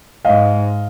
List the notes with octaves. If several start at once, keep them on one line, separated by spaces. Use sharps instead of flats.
G#2 D#5 F5